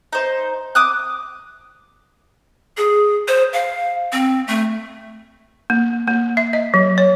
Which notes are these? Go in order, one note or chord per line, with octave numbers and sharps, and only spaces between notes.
D#4 C5
D6 D#6 F#6
G#4
C5
F5
C4
A3
A#3
A#3
E5
D#5
F#3
C#5